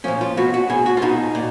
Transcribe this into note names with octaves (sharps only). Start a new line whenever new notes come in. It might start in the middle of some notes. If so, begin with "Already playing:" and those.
A#2 F3 C#4
F4
B2 F#4
F#4
B2 G#4
F#4
F4
B2 D#4
A#2